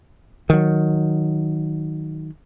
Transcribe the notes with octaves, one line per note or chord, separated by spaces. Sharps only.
D#3 F#3